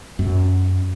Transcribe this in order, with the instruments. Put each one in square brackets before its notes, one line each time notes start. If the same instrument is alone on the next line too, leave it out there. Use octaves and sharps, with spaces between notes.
[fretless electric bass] F#2